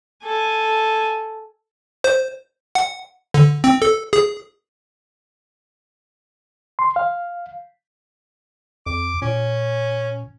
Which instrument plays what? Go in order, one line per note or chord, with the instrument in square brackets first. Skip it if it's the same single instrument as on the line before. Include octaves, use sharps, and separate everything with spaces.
[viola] A4 G#5
[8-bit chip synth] C5
F#5
D3
C4
A4
G#4
[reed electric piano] C6
F5
[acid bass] F2 [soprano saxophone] D6
[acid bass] A#2 [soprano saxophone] C#4